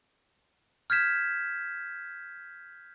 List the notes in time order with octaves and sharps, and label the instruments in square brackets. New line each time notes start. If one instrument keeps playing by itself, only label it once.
[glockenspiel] F6 G6 G#6 B6 E7